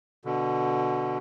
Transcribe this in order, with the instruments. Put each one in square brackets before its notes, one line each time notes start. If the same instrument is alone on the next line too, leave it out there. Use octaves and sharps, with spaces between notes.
[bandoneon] B2 D3